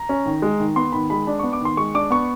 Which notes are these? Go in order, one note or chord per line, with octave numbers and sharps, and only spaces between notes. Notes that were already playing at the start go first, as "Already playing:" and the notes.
Already playing: A#5
C#4
D#3
G#3
D#3
B3 C6
D#3 B5
G#3 B5
D4
B3 C#6
D6
D#3 C6
G#3 C#6
D4 D6
B3 C#6